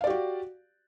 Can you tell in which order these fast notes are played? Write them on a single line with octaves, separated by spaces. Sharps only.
F5 D5 G4 F#4